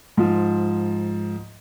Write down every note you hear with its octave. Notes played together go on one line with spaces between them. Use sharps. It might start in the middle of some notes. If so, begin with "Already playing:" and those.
G#2 F3